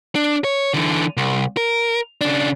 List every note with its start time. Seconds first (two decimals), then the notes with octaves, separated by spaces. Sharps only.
0.15 D4
0.44 C#5
0.74 D3 E3
1.17 C2
1.57 A#4
2.21 C#3 D4